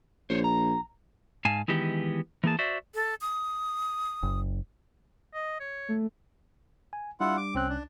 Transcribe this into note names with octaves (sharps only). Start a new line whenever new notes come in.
A#1 C5 C#5
A#5
G#2 F5 G#5 A5
D#3 E3 G#3 B3 G4
E3 A#3 G#4 A5
F#4 C5 D5 E5
A4
D#6
F#1
D#5
C#5
A3
G#5
G3 D4 E4 F4 F#5
D6
C2 C4 C#4 F#6
D4